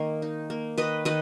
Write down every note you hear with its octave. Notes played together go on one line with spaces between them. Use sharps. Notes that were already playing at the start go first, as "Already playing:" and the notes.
Already playing: D#3 A#3 D#5
D#4
A#3
D#3 B4 D#5
D#3 B4 D#5